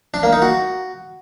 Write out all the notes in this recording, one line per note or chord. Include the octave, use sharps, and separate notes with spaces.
D4
A#3
D#4
F#4